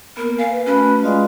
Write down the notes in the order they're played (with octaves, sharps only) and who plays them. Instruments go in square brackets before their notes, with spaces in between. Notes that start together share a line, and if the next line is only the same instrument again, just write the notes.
[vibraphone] A#3 B3 [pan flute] A#4
[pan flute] F5 [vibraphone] G#5
[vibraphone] B4
[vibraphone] A3 F#4 [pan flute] C#4 [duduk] B4
[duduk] G#3 [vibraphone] F4 D5 F5